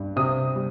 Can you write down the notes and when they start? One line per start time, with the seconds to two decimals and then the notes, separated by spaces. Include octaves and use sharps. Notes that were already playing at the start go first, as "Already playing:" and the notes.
Already playing: G2
0.16 C3 D#6
0.55 G3